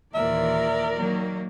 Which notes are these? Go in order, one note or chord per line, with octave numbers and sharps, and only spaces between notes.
D#2 A#2 E3 A#4 D5 E5
D#3 F#3 A#3